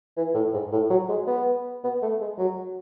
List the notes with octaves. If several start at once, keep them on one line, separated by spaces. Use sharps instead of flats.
E3
A2
G#2
A2
F#3
G#3
B3
B3
A3
G#3
F#3